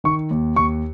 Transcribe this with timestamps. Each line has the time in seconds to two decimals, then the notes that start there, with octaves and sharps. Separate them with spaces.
0.04 D#3 C#6
0.31 D#2
0.56 D#2 C#6